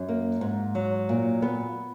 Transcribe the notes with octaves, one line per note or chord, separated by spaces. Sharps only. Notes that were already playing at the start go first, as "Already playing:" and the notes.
Already playing: F#2
A#3
G#2
F#3
A#2
B3